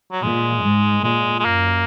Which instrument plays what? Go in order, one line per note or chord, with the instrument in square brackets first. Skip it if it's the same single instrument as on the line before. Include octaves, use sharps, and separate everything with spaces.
[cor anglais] F#3
[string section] A#2 [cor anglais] G#3
[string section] G#2
[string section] A#2 [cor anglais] G#3
[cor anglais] G#3
[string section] F#2 [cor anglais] A#3